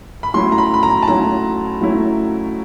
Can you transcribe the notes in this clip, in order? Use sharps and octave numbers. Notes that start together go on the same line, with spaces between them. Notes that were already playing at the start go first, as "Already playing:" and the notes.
B5
F#3 A3 C#4 E4 C6
A#5
B5
B5
A#5
A5
F#3 A3 C#4 E4 A#5
F#3 A3 C#4 E4